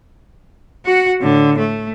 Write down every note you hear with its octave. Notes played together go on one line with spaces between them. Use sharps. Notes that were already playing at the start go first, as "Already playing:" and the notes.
F#4 F#5
A2 D3
A3